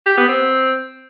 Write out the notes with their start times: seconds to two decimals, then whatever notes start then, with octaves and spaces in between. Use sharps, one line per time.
0.06 G4
0.17 B3
0.28 C4